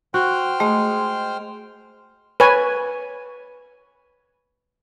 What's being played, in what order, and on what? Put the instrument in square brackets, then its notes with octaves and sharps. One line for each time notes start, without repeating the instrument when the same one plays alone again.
[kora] F#4 [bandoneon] C5 G5 F6
[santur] G#3 [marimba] A3
[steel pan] B4 C#5 G#5